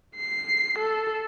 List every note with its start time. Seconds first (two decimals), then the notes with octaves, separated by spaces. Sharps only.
0.16 C7
0.78 A4